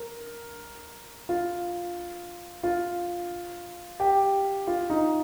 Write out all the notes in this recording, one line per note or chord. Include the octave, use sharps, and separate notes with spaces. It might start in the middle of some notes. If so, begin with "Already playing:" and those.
Already playing: A#4
F4
F4
G4
F4
D#4